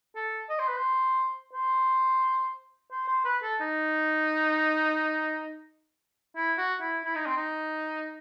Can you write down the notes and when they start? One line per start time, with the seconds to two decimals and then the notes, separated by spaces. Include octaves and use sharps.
0.15 A4
0.50 D#5
0.59 C5
0.68 B4
0.77 C5
1.53 C5
2.92 C5
3.08 C5
3.25 B4
3.42 A4
3.60 D#4
6.36 E4
6.58 F#4
6.81 E4
7.05 E4
7.15 D#4
7.26 C4
7.37 D#4